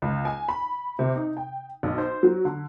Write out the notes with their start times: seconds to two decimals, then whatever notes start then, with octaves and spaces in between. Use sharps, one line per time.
0.02 C#2
0.25 G#5
0.49 B5
0.99 C3
1.15 D#4
1.37 G5
1.83 B1
1.98 C5
2.23 F#3
2.45 D3